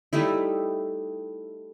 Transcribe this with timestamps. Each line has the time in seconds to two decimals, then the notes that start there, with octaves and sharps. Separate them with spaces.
0.13 G3 A3 D#4 E4